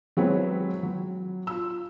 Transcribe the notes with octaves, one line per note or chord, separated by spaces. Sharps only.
F#3 G#3 C4 E4 B4 C#5
F#3
F4 E6